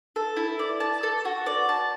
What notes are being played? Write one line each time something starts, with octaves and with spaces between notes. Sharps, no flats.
A4
E4
D5
A5
A4
F#4
D5
A5